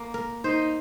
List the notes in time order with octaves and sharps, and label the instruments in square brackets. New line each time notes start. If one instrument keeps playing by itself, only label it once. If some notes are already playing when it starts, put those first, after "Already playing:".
Already playing: [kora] A#3
A#4
[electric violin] D#4 [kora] C5